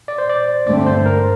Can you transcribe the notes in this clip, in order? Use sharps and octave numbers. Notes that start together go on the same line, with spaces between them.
D5
C5
D5
G2 D3 A3 C4 D5
C5
A#4